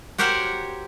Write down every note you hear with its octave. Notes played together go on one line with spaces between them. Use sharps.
F#4 G4 A#4 C5 C#5 F#5